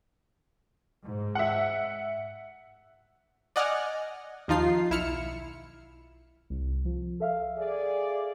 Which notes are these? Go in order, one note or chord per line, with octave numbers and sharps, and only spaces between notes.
G#2
E5 F#5
D5 D#5 F#5 G#5 F6
D#2 F3 D#4 F4 C7
B1 E4 E6 F6 C#7
C2
F3
A4 E5 F5
G#4 D5